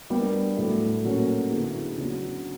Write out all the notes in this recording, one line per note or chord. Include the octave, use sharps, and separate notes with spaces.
G3 B3 D4 G4 A#4
A2 F#3 A3
A#2 F#3 A3 C#4
D3 F#3 B3 E4 G#4
C#3 F#3 B3 D4